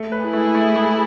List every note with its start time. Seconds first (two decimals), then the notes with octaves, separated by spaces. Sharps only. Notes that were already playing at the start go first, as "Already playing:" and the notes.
Already playing: A3
0.12 B4
0.23 E4 G#4
0.33 A3
0.55 A3
0.76 A3